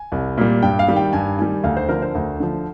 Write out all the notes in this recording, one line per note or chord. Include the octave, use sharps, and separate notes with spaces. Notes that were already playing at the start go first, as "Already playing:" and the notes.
Already playing: G#5
C2
A#2 G3
G2 G5
F5
D#3 G3
G5
G2 G#5
D#3 G3 G#5
D2 F5
C5
D3 F3 A#4
C5
D2
D3 F3